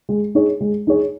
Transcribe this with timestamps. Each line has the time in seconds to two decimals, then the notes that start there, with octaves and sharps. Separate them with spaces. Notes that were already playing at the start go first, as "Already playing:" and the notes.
0.09 G#3
0.35 D#4 G#4 C#5
0.61 G#3
0.87 D#4 G#4 C#5